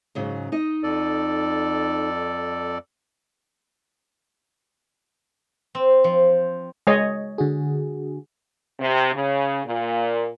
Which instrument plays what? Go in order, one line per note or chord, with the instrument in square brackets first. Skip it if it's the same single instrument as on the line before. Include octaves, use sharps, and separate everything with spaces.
[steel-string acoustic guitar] G#2 C#3 F#3
D#4 D#5
[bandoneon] F2 A4 D5
[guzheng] C4
F3
[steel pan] G#3 C#5 D#5
[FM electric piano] D3 F#4 G#4
[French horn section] C3
C#3
A#2